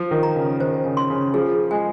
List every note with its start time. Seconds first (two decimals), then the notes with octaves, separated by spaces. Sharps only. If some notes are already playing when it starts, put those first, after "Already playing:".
Already playing: F3
0.11 D#3
0.23 A#5
0.36 C#3
0.60 D#3 C5
0.85 C#3
0.97 C6
1.10 C#3
1.34 F3 G#4
1.71 G#3 G#5